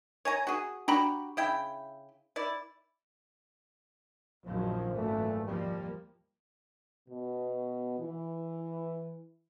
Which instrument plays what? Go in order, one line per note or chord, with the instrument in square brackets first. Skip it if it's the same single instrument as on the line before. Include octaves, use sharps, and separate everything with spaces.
[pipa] C#5 G#5 A#5
F#4 G#4
[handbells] D4 A#5 B5 [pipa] F#4 G4
[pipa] C#3 E4 G5
E4 D5
[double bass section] A#1 F#2 D#3 [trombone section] F3
[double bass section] G#1 F#2 E3 [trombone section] A#2 A3
[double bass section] D#2 F3 A#3 [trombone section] G3
[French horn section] B2
E3